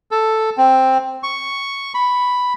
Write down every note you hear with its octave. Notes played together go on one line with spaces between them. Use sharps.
A4
C4
C#6
B5